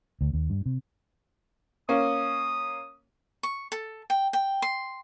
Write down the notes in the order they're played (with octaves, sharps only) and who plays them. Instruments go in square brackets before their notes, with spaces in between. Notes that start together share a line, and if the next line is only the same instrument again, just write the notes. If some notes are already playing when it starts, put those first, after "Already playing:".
[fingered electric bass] D2
D#2
G2
C3
[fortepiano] A#3 C#4 [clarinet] D#6
[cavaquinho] C#6
A4
G5
G5
C6